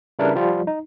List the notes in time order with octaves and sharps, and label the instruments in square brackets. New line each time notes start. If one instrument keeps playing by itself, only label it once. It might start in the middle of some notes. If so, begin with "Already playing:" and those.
[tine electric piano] C#3 G3 D4 E4 A#4 B4
F3 G3 F4
D#4